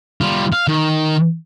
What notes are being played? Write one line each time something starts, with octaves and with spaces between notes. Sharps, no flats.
G3 F4
F5
D#3